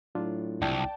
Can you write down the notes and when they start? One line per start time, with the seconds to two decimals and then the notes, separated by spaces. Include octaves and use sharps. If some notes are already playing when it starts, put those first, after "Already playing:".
0.15 A2 F#3 D4 F4
0.62 C2 D5 G5 A5